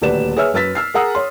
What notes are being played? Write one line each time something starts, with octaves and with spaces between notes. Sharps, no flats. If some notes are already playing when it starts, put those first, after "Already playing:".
D#1 D2 G4 B4 D5 E7
G#4 B4 C#5 E5 E6 F6
F#2 B4 E6 A6 B6
E6 F6 C7
G#4 A#4 F#5 A#5 D#6 E6
C#5 C6